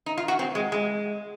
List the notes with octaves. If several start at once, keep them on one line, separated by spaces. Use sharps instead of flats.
D#4
F4
F#4
C4
G#3
G#3